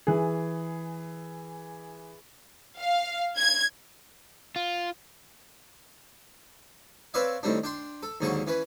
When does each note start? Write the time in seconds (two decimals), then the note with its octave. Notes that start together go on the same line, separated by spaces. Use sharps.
0.07 E3 G#4
2.79 F5
3.36 G#6
4.56 F4
7.14 C4 B4 C#5 D5 E5 F5
7.43 A2 D#3 G3 C4 D4
7.64 D4 G5 C6
8.03 A4
8.21 D#2 G#2 D3 F#3 A5 C#6
8.47 E3 C#4 B4